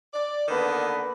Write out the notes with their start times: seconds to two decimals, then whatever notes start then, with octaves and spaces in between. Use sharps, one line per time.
0.14 D5
0.48 D3 D#3 A#3 B3 B4